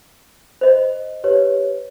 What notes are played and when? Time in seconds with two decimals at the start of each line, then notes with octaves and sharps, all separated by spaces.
0.61 C5 D#5
1.24 G4 B4 C#5